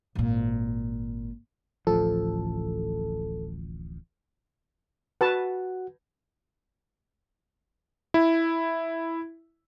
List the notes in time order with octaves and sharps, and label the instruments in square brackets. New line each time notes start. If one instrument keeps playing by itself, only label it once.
[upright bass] G#1 A#2
[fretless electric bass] D1 A1 F3 [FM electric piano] A4
[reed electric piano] F#4 F#5 [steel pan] B4 A5
[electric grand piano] E4